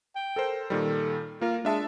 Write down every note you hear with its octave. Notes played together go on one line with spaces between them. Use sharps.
G5
A4 A#4 C5
A#2 D#3 G3 A4
A#3 F4 A#4
G#3 D4 E5 A5